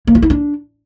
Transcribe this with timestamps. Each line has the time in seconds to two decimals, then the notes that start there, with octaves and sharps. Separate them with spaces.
0.07 A#3
0.15 F4
0.22 E4
0.30 D4